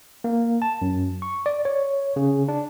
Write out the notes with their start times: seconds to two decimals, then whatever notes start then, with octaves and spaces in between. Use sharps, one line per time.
0.24 A#3
0.62 A5
0.82 F#2
1.22 C#6
1.46 D5
1.65 C#5
2.16 C#3
2.48 D4